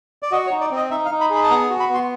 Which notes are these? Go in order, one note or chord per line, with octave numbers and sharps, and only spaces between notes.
D5
F#4 D#5
C#5
D#4
D5
C4 D#5
D#4 E5
F5
D#4
B5
G#4
B5
A5
B3 A#5
F#4
B5
B3
C6